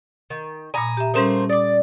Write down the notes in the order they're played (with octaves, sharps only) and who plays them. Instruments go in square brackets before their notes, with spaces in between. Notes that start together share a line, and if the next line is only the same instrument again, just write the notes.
[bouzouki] D#3
[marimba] A#2 B5 D#6 [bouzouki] G#5 A#5
[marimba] G4 E5
[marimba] G3 C#4 D#6 [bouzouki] A3 A#3 C5
[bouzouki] D5 [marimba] D6 D#6